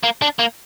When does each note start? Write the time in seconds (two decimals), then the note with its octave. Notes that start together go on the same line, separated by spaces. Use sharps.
0.03 A#3
0.22 D4
0.39 A#3